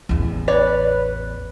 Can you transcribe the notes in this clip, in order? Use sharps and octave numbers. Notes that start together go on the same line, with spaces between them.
A1 E2
B4 C#5 D5